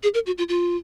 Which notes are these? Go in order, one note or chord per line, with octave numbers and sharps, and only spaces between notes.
G#4
A#4
F#4
F4
F4